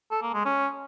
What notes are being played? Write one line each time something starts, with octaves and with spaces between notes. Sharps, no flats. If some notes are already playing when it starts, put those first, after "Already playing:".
A4
A#3
G#3
C#4